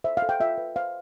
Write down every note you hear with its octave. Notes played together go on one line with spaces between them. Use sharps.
C5 E5
F5
A4
G5
F4 E5
B4
C5 F5